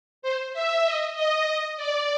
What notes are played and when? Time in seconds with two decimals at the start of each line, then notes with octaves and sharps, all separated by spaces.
0.22 C5
0.53 E5
0.85 D#5
1.15 D#5
1.46 D#5
1.77 D5